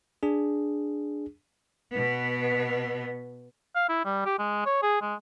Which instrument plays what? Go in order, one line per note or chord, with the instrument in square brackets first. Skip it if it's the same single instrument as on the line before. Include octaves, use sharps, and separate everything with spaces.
[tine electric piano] D4 G#4
[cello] B2 B3
[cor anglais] F5
E4
G3
G4
G#3
C#5
G#4
G#3